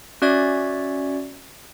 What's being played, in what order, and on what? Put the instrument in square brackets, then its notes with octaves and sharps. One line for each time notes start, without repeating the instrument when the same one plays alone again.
[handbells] C#4 F#4 D5 E5 G#6